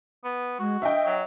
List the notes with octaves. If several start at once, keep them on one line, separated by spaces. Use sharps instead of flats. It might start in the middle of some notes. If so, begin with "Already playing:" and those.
B3
G#3 F#4
D#5 E5 G5
F#3